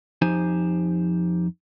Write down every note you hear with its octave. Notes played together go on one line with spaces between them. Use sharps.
F2 F3 D#4 G4 C5 G#5